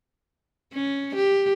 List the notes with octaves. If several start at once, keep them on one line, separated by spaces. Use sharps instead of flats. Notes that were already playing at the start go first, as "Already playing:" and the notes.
C#4
G4